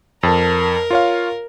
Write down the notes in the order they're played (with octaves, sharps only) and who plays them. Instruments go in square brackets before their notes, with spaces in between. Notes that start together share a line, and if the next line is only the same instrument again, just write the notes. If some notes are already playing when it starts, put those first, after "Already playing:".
[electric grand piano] F2 A5 [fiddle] A#4
[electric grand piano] F4 C#5 F5